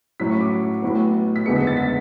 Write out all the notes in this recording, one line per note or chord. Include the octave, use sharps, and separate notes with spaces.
A2 F#3 C#4 E4 B6
C#6
D6
A1 A2 F#3 B3
B6
F#1 E2 D3 G#3 B3 C#7
B6
A6
B6